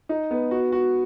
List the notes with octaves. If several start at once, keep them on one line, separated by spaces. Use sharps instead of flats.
D#4
B3
F#4
F#4